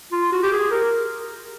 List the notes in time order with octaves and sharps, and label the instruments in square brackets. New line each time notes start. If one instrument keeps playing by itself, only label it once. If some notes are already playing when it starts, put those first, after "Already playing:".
[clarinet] F4
F#4
G4
G#4
A#4